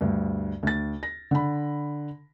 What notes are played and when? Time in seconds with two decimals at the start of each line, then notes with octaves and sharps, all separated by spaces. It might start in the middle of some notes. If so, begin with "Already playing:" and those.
0.01 D2 G2
0.63 D2 A6
1.03 A#6
1.31 D3 B5